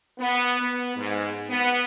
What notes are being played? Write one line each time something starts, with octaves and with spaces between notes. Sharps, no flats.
B3
B3
G#2
B3